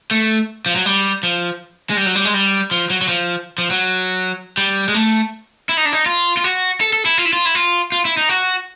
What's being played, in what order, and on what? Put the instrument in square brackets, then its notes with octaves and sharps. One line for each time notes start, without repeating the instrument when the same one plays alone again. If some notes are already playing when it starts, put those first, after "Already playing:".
[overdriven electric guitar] A3
F3
F#3
G3
F3
G#3
G3
F#3
G3
G#3
G3
F3
F#3
F#3
F3
F3
F#3
G3
G#3
A3
E4
D#4
D4
D#4
F4
F4
F#4
A4
A4
E4
F4
E4
F4
E4
F4
F4
E4
D#4
F#4